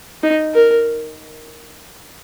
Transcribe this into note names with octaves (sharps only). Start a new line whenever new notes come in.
D#4
A#4